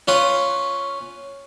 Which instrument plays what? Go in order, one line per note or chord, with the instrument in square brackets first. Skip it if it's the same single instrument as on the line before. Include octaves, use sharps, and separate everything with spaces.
[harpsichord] C#4 F4 B4